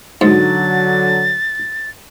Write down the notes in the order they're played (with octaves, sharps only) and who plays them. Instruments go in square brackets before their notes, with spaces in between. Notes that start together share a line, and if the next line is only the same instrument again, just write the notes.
[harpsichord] G#2 [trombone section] D3 F#3 [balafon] D#4 F#4 [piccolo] A6